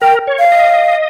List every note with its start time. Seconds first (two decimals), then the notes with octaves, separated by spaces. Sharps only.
0.02 A#4 G5
0.27 C#5
0.39 F5
0.52 D#5